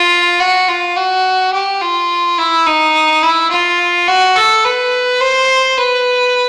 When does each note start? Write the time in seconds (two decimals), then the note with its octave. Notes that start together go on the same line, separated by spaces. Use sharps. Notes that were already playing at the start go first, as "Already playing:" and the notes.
Already playing: F4
0.40 F#4
0.68 F4
0.96 F#4
1.53 G4
1.81 F4
2.38 E4
2.66 D#4
3.22 E4
3.51 F4
4.07 F#4
4.36 A4
4.64 B4
5.21 C5
5.77 B4